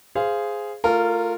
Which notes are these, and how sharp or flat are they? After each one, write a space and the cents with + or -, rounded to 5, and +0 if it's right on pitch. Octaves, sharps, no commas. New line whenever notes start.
G#4 +0 C5 -10 F5 -15
A3 +5 F4 +0 A#4 -20